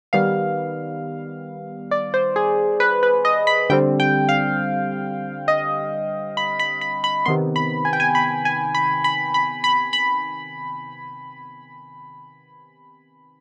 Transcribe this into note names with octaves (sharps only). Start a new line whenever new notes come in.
D#3 G3 B3 F5
D5
C5
G#4
B4
B4
D#5
B5
D3 G3 C4 G5
G5
F5
D#5
B5
B5
B5
B5
C3 D#3 B3 C6
B5
G#5
G5
G#5
B5
G#5
B5
B5
B5
B5
B5